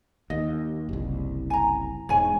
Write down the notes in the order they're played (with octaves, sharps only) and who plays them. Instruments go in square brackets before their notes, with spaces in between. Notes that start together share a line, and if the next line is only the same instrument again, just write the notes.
[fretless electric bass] D#2 [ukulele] D#5
[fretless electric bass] F#1 C2
[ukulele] G#5 A#5
[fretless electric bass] E1 G#2 [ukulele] C#5 G#5